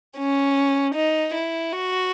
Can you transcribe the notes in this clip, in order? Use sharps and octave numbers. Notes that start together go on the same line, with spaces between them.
C#4
D#4
E4
F#4